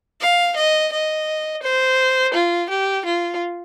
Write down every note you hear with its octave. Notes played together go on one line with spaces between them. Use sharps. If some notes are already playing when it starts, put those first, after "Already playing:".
F5
D#5
D#5
C5
F4
G4
F4